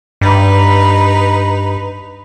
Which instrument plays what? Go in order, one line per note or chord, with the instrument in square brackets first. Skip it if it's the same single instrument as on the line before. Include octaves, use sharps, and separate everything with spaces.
[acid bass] G2 [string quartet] D#4 B4